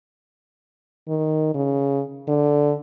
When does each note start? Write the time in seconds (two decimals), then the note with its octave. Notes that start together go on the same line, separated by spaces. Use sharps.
1.08 D#3
1.54 C#3
2.28 D3